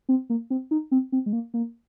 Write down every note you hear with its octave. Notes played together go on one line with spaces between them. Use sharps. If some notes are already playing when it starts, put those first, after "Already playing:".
C4
A#3
C4
D#4
C4
C4
G#3
A#3
A#3